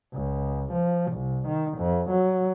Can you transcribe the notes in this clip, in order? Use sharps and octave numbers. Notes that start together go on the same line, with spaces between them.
C#2
F3
C2
D#3
F2
F#3